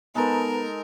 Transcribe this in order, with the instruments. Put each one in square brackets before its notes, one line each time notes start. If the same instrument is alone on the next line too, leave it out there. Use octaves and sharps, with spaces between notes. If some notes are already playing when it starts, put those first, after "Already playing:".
[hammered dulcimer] G#3 D#4 A4 [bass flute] B3 [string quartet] A#4